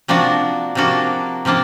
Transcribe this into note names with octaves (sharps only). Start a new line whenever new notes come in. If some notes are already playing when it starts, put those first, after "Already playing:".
C3 F3 A#3 D4 F#4
C3 F3 A#3 D4 F#4
C3 F3 A#3 D4